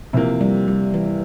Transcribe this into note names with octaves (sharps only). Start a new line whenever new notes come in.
C3 E3 F3 A#3
G3
G3
E3